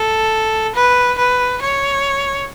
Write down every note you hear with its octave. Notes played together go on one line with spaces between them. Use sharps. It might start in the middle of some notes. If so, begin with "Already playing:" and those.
Already playing: A4
B4
B4
C#5